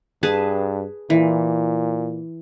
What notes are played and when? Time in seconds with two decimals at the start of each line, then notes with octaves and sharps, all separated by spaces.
0.23 G2 G#4 B4 A5
1.10 A#2 E3